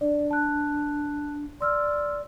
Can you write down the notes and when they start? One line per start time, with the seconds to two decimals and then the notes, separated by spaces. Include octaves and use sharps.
0.01 D4 D5
0.31 A5 F#6
1.61 D5 C6 E6 F6